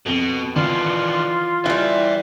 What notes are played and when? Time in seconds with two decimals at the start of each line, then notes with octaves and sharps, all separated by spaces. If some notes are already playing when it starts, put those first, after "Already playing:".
0.06 F2 B2 G7
0.56 D#3 E3 D4 F4
1.66 E3 G3 E4 E5 G5